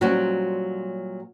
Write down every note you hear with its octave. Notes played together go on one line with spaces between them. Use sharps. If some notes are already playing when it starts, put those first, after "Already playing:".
A#2 F#3 G3 C4 C#4 F#4